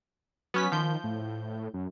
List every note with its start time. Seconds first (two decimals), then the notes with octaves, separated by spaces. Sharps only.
0.54 F#3 B3 C#4 B6
0.72 D#3 F3 G6
1.04 A2
1.74 F#2